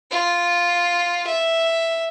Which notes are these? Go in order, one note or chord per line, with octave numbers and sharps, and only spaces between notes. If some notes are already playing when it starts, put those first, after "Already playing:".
F4
E5